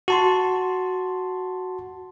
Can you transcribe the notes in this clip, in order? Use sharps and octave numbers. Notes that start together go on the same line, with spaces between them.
F#4 A5 C6